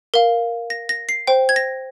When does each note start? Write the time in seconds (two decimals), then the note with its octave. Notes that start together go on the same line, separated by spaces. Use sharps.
0.14 A#4 F5
0.70 A#6
0.89 A#6
1.09 C7
1.27 C5 G5
1.49 G#6
1.56 A#6